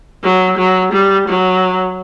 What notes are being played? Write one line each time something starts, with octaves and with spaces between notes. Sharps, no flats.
F#3
F#3
G3
F#3